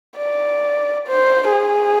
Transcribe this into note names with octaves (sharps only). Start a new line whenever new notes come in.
D5
C5
G#4